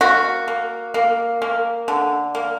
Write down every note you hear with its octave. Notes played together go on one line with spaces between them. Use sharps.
A#3 F#4
A#3
A#3
A#3
D3
A#3